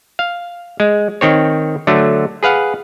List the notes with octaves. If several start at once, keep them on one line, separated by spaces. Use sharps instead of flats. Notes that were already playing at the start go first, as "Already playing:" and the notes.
F5
G#3
D#3 C4 C#5
D3 F#3 A3
G#4 B4 F5 F#5